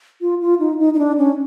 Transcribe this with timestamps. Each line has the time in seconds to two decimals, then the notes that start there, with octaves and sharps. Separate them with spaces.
0.21 F4
0.41 F4
0.59 D#4
0.79 D#4
0.94 D#4
0.99 D4
1.18 C#4